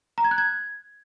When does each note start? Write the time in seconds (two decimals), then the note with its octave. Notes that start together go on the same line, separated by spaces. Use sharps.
0.18 A#5
0.24 G#6
0.31 F#6
0.38 G#6